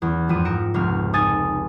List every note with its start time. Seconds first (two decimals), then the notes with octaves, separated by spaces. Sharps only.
0.02 E2 C#4
0.28 G#1 F2 D#7
0.45 G#2 A#4 A#5 C#7 D7 E7
0.74 F1 C#2 C4 C#5 F6
1.13 D#4 A4 G#5 D#6 A6 D#7